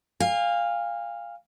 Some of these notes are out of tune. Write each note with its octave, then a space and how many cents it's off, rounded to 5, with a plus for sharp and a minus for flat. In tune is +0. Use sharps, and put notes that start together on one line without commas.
F5 +0 G#5 -40